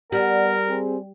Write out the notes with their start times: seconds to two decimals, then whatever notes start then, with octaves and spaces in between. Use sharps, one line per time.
0.12 G3 B3 A#4 D5 F#5
0.67 C4 G#4